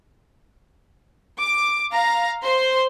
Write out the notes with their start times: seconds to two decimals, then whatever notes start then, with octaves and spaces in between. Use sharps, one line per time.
1.39 D6
1.93 F5 A#5
2.43 C5 C6